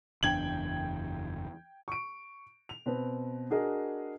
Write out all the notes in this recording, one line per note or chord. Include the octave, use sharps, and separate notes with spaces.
F#1 E2 D4 G5 G#6 F#7
C#6 D7
F7
B2 C4 B4
D4 F#4 G#4 A#4 D#5